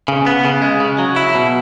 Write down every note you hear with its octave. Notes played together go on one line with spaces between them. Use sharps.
C#3
B3
C#3
G#3
C#3
F#3
E4
B2